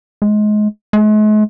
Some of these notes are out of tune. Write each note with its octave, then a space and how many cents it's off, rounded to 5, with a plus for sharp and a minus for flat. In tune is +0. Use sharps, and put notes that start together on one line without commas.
G#3 +25
G#3 +45